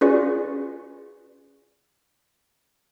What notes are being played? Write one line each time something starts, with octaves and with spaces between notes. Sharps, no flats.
C#4 F4 F#4 G#4 B4 D5